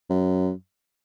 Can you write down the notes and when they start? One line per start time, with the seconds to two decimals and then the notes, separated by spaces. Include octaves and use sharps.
0.10 F#2